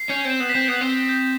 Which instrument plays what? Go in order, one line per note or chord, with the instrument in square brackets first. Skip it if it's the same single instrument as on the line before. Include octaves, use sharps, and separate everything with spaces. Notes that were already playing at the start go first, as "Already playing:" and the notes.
Already playing: [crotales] C7
[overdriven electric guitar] C#4 [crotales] G6
[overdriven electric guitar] C4
[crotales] E7
[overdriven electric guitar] B3
[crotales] B6
[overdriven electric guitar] C4
[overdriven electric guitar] B3 [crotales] D#6
[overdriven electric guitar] C4
[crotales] C7
G6